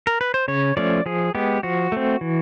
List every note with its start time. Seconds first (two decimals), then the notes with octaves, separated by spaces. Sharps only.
0.07 A#4
0.21 B4
0.34 C5
0.48 C#3 C#5
0.77 F3 A3 C#4 D5
1.06 F3 G#4
1.35 G#3 B3 G4
1.63 F3 F#4
1.92 A3 C4
2.21 E3